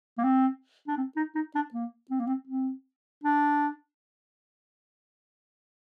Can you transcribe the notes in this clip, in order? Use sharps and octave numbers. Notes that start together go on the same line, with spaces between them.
A#3
C4
D4
C4
D#4
D#4
D4
A#3
C4
A#3
C4
C4
D4